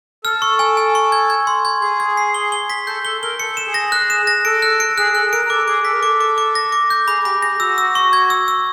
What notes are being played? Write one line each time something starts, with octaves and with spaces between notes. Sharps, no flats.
A4 F6
C#6
G#5
G#5
C#6
G#6
G#6
C6
G#6
G#4 G#6
G#6
C7
G7
G7
B6
A4 G6
A4 G7
A#4 G7
A4 C#7
E7
G#4
A#6
F#6
E7
A#6
A4 D7
F#6
D7
G#4 F#6
A4 F#6
A#4 D7
A#4
A4 D6
G#4 D6
A4 B6
A#4
A4 D6
D6
D6
A#6
D6
G6
G#4 B5
G4 B5
G#4 A#6
F#4 E6
E6
C#6
G#6
E6
E6